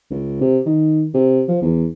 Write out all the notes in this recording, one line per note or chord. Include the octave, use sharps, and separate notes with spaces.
C#2
C3
D#3
C3
F3
E2